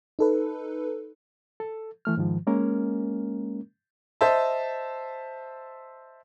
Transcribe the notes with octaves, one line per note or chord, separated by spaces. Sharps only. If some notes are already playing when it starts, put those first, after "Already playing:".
D#4 A4 B4
A4
E3 A3 F6
G#2 D#3 F3
G#3 A#3 C#4 A#4
C5 D#5 E5 A5